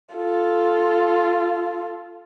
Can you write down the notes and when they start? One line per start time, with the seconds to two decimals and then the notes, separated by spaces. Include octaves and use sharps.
0.15 F4 A4